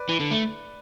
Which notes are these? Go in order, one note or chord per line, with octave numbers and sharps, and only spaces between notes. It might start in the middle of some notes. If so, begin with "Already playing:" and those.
Already playing: B4 D5
E3
D3
A3